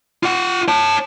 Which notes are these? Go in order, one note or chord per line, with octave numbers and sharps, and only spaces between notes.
F4 F#5
C#5 A5